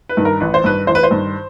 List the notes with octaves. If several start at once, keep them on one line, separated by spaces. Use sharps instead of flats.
B4
G2 D#3
A#4
A1 B4
C5
G2 D#3 B4
A1 C5
B4
C5
G2 D#3